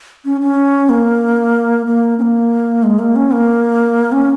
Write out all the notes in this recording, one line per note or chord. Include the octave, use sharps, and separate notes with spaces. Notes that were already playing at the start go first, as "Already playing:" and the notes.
C#4
C#4
A#3
A#3
C#4
A#3
G#3
A#3
C#4
A#3
C#4